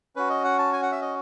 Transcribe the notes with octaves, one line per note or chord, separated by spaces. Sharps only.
C#4 F#4 B4
D#5
F#5
A5
G#5
F#5
E5
D#5